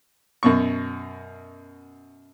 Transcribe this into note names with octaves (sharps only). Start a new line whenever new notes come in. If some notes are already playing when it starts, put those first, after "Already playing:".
F#2 B2 C#6